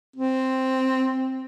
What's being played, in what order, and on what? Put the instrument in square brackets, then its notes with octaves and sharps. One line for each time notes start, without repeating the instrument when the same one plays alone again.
[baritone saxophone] C4